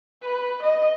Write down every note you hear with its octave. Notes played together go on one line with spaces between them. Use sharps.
B4
D#5